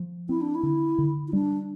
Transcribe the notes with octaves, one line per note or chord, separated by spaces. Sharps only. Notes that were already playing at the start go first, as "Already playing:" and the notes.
Already playing: F3
C4 E4
D4
E4
D3
D3
E4
G3 D4